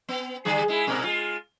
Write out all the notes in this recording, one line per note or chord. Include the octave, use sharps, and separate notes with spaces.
B3
D3 G3 G#4
G#3 E4
G#2 B2 A#4
G#3 F4